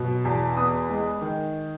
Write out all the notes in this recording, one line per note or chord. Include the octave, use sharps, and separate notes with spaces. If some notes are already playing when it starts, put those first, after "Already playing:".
Already playing: B2 F#3
E2
B3 D#6
G#3
D#3